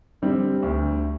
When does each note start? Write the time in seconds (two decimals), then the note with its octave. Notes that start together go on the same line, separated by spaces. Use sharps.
0.22 D3 G3 C4
0.63 D2